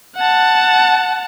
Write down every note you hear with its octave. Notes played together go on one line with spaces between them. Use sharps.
F#5 A5